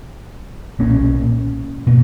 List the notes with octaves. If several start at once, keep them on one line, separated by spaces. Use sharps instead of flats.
B1 A#2 A#3 C#4
B2 A#3